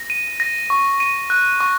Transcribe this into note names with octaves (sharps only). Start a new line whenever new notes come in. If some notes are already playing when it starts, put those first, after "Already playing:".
Already playing: A#6
D#7
A#6
C#6
D#7
F#6
C#6